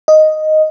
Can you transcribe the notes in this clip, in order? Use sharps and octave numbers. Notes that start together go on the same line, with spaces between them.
D#5